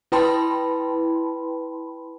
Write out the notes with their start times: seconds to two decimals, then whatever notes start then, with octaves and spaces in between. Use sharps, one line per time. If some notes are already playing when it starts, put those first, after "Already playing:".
0.12 E4 B4 G5 A5 B5 C6